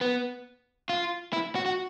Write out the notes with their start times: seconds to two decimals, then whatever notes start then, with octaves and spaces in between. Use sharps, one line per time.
0.01 B3
0.89 F4
1.33 E4
1.55 F#4
1.66 F#4